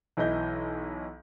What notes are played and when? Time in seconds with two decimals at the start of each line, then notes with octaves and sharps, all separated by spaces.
0.17 B1 E3 D#5 G6